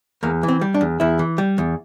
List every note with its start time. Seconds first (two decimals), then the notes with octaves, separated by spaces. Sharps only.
0.23 E2 A#3
0.43 E3
0.48 C4
0.61 G3
0.74 D4
0.81 E2
1.00 E2 E4
1.19 E3
1.38 G3
1.58 E2